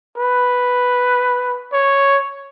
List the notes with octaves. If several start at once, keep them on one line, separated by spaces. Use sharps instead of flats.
B4
C#5